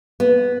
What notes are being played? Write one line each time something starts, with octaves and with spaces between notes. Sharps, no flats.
B3